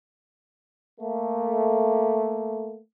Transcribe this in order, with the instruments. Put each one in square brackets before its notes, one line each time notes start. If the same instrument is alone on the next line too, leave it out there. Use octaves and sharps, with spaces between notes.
[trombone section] A3 A#3